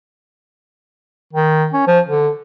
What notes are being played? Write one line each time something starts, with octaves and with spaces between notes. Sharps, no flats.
D#3
C#4
F3
D3